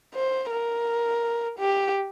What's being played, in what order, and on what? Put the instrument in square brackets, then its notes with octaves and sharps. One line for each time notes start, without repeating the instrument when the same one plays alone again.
[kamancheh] C5
A#4
G4